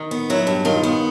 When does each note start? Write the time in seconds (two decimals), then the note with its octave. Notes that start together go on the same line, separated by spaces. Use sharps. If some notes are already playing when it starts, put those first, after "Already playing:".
Already playing: D#3
0.11 B3
0.30 F#3 E4
0.47 G2
0.65 D#3 F4
0.83 B3